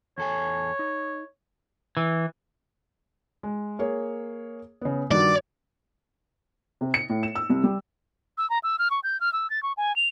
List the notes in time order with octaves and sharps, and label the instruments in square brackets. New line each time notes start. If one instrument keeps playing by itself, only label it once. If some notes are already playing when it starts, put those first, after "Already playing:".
[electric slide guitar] E2 A4 G#5 [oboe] C#5
[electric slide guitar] D#4
[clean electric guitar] E3
[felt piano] G#3
A#3 G#4 C#5
C#3 B3
[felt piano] G2 D#3 F#4 [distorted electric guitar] D5
[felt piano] C3
C#7
A2
E7
E6
C2
G3
[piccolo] E6
A#5
E6
F6
C#6
G6
F6
E6
A6
C#6
G#5
F7